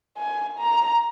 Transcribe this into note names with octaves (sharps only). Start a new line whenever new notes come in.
G#5
A#5